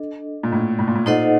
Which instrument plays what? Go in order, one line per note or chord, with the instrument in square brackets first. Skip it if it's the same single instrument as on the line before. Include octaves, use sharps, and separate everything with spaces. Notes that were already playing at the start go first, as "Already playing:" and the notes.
Already playing: [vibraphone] D4 A4 D#5
[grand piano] A#2
A2
A2
A#2
A2
[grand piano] A#2 [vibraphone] D#4 A4 C5 D#5 F#5